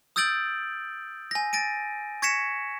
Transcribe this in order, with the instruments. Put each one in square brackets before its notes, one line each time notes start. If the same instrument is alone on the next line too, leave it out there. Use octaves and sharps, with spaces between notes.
[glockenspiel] D#6 E6 G6 A6 D7 F#7
G#5 A#6
A6 A#6 D7 D#7
C#6 G#6 A#6 B6 C#7 E7